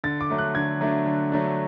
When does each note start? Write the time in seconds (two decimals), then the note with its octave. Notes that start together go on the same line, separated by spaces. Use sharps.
0.04 D3 A6
0.21 D6
0.30 F#3 A3 D4
0.38 F#6
0.55 D3 G#6
0.81 F#3 A3 D4
1.06 D3
1.32 F#3 A3 D4